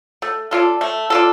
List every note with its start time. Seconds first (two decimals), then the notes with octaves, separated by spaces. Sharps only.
0.22 A3
0.51 D4 F4 A4
0.81 A3
1.10 D4 F4 A4